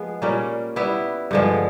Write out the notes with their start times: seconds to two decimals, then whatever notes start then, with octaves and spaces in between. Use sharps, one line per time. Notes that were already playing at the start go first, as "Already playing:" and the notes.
Already playing: F3 G#3 B3
0.22 A#2 G3 A#3 C#4
0.76 G3 B3 E4
1.31 G2 D3 F3 G#3